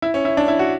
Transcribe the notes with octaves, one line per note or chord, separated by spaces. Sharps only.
E4
C#4
E4
D4
E4
F#4